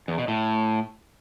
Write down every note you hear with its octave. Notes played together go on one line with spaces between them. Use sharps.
E2
B2
A2